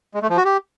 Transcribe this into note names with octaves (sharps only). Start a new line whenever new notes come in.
G#3
A3
F3
F#4
G4